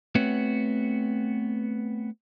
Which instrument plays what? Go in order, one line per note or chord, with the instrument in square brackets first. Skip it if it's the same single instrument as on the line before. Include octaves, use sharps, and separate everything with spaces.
[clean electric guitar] A3 B3 C4 F#4 B4 C#5